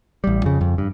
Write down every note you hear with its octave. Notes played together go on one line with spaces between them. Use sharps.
A1 G3
F2 C#3
F2
G2